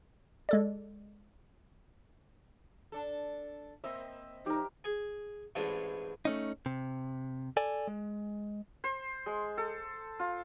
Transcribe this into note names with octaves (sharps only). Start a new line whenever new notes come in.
G#3 A4 D5
D4 A4
A#3 C4 D#5 E5
F3 D#4 G4 A#4
G#4
A1 G#2 E3 D4
A3 C#4 D#4
C3
A4 D5 G#5
G#3
C5
G#3
A4
F4